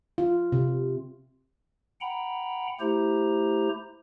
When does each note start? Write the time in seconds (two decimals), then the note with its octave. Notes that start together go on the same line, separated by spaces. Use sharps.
0.18 F4
0.52 C3
2.01 F#5 G5 A#5 B5
2.80 A3 E4 G4 C5 A#5